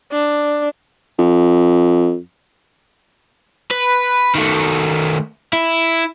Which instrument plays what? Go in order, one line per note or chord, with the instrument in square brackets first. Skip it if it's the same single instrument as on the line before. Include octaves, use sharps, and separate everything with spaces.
[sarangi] D4
[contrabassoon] F2
[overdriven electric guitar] B4
D#3 A3
E4